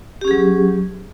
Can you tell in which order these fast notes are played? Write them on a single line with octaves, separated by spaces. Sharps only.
G4 C#4 G#4 F#3